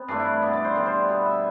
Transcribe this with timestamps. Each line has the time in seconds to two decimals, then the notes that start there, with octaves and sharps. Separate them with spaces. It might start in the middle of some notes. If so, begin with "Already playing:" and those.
Already playing: B3 C4
0.08 G2 E3 A3 D4
0.20 E4
0.42 B2 B3 D5
0.53 D5
0.64 C5
0.75 D3 G3 B3 D5
0.86 C5
1.08 B2 B3 B4
1.25 E5